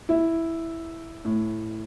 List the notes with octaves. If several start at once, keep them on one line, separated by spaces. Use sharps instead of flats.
E4
A2